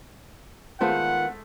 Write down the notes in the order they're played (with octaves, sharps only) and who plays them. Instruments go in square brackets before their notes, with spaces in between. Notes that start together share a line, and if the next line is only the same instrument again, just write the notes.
[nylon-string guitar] D#3 B3 F4 [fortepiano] G#3 A3 C5 [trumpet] F#5